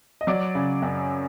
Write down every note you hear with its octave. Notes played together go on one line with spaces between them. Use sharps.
D#5
F#3 D5
C#3
F#2